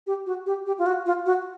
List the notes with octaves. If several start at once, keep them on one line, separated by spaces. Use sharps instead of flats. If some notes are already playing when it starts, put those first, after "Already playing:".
G4
F#4
G4
G4
F4
F#4
F4
F#4